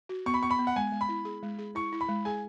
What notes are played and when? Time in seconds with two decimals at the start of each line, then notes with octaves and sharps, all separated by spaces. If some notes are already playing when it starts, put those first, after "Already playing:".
0.09 F#4
0.26 B3 C#6
0.34 B5
0.43 B3 C#6
0.51 B5
0.59 B3
0.67 F#5
0.76 G#3 G#5
0.92 G#3
1.01 B5
1.09 E4
1.25 G#4
1.43 G#3
1.59 G#4
1.75 E4 C#6
1.92 E4
2.01 B5
2.08 G#3
2.25 G#4 G#5